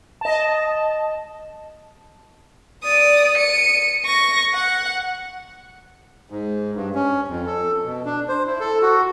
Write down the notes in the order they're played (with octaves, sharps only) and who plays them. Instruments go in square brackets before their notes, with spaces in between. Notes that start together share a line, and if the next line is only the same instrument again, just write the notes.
[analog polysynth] D#5 A5
[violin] D5 D#6
C#7 D#7
C#6 A#6
F#5
[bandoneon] G#2
G2
C#4
F2
A4
B2
D4
C5
E4
A4
F#4